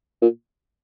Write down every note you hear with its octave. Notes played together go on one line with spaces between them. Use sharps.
A#2